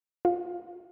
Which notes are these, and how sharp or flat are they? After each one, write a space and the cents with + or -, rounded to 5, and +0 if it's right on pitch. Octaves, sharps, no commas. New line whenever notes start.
F4 +15